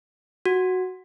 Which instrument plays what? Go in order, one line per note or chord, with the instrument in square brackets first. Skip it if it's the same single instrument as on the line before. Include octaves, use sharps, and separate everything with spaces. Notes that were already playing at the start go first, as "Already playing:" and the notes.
[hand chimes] F#4